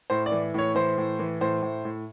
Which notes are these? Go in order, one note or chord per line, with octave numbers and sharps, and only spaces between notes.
A2 C5
D5
E3
A2 C#5
E3 C5
A2
E3
A2 C5
A2
A2